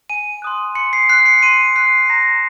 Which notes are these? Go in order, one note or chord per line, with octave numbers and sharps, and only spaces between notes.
G#5 D#7
C6 D#6 F#6
C6 C#7
C7
F#6 C7
C#7
C6 D#7
F#6 C7
A#5 A#6